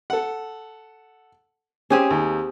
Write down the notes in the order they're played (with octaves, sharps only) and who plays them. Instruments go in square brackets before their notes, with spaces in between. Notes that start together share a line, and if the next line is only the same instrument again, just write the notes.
[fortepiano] A4 F#5
[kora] C4 G4 G#4 [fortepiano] C#4 G#5
[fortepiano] D#2